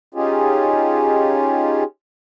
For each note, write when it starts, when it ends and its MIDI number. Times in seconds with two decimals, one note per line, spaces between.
0.15 1.84 61
0.15 1.84 63
0.15 1.84 65
0.15 1.84 67
0.15 1.84 68